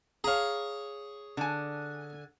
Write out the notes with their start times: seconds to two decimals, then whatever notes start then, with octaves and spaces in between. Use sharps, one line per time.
0.24 G#4 C#5 F5 A#5
1.37 D3 G#5